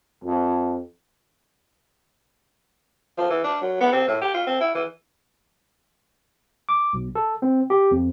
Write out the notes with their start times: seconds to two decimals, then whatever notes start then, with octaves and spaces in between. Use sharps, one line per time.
0.24 F2
3.18 F3
3.30 E3
3.44 D4
3.61 F#3
3.81 B3
3.92 C4
4.07 A2
4.22 G4
4.34 F4
4.47 C4
4.61 E4
4.75 E3
6.69 D6
6.93 B1
7.15 A4
7.42 C4
7.70 G4
7.91 F2